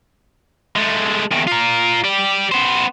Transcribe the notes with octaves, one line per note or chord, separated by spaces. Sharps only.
G#3 A3
E2 D#3
F4 A#4
G4 D5
B3 C5